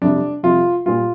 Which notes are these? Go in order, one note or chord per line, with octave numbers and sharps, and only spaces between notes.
F2 C3 G3 D4
F2 C3 G3 F4
A#2 G3 F4